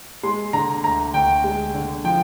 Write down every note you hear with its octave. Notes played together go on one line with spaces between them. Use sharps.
G#3 C6
D3 A#5
D2 A#5
D2 G5
G#3
D3
F3 G5